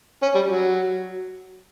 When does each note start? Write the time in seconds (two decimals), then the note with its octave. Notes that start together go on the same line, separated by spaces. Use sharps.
0.22 C#4
0.35 G3
0.48 F#3